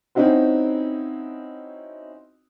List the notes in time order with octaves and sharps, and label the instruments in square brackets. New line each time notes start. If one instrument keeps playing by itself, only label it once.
[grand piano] C4 C#4 D#4 E4 F#4 C5